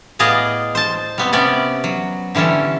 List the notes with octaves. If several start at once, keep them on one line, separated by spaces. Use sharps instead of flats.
A2 B3 G#4 D5 D#5 F5
C5 A5
G3 B3 C4
C3 B3 C#4 D5
F#3
D3 E3 G3 C#4 A4